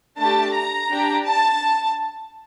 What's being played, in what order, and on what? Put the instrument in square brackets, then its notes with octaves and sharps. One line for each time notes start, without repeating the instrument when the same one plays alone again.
[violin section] A3 D4 G4 A5
A#5
D4 G4
A5